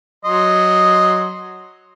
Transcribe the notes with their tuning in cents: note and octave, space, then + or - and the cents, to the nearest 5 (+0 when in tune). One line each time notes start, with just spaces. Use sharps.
F#3 +0 D#5 +0 C6 +5